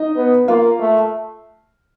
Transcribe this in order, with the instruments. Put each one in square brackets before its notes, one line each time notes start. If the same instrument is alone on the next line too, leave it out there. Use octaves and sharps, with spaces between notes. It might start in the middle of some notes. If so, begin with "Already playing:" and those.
Already playing: [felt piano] D#4 D#5
[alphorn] B3
[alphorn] A#3 [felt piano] F4 F5
[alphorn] A3